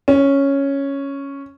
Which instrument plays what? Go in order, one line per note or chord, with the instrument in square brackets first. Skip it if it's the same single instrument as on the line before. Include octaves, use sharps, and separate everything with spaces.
[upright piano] C#4